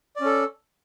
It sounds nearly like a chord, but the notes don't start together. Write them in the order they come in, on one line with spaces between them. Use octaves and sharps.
D5 C#4 A4